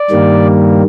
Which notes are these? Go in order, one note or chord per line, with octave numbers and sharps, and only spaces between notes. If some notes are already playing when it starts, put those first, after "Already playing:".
Already playing: D5
G2 D#3 G3 A#3